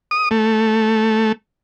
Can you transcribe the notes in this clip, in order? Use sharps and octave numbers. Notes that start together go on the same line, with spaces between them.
D#6
A3